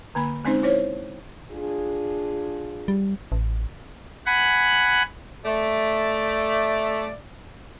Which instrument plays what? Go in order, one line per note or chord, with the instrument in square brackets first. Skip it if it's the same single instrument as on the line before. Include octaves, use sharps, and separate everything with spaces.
[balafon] D3 A#3 B5
G#3 C4 C#4 D#4 C5
E4 C5 C#5
[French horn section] D4 F4 G#4
[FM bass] G3
A1
[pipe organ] F#5 G#5 B5
[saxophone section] A3 D5